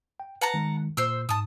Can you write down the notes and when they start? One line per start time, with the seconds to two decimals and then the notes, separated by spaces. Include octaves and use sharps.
0.20 G5
0.41 B4 F#5 A5 A#5
0.54 D#3 G#3
0.97 A#2 C5 E6
1.29 G#2 A5 D#6